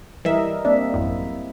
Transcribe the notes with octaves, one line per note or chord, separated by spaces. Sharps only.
E3 G3 A#4 D#5 E5
A#3 C4 D4 E5
A1 F#2 E4